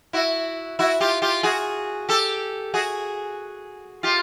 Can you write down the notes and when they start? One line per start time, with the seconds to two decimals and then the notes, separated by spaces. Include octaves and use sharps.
0.13 E4 F#4
0.79 E4 F#4
1.00 F4 G4
1.22 F4 G4
1.43 F#4 G#4
2.09 G4 A4
2.74 F#4 G#4
4.03 F4 G4